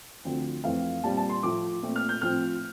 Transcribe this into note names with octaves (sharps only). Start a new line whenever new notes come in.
D2 D3 F3 C4
F2 E3 A3 C4 F5
A#2 G3 C4 A5
A5
C6
A2 F3 A3 D6
A#2 A3 C4
F6
G6
A2 F3 C4 F6